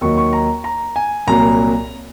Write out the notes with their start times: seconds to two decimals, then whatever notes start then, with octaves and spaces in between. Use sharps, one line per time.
0.01 D#2 D#3 F#3 C#6
0.17 C#6
0.33 A#5
0.64 A#5
0.96 G#5
1.27 C2 A#2 F#3 A#5